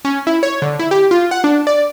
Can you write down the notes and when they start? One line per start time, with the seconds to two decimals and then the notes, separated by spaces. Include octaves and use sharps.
0.05 C#4
0.27 E4
0.43 C#5
0.62 D3
0.79 E4
0.91 G4
1.11 F4
1.31 F#5
1.44 D4
1.67 D5